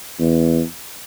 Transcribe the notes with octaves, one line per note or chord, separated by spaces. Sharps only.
E2